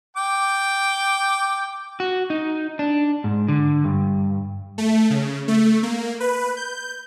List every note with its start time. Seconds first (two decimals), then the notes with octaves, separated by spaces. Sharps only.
0.17 G5 D6
2.00 F#4
2.30 D#4
2.79 D4
3.24 G#2
3.48 D3
3.84 G2
4.78 A3
5.10 C#3
5.48 A3
5.83 A#3
6.20 B4
6.57 G6